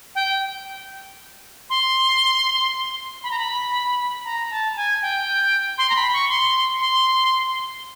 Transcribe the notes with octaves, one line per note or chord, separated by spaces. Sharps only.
G5
C6
B5
A#5
B5
A#5
A5
G#5
G5
C6
A#5
B5
C#6
C6
C6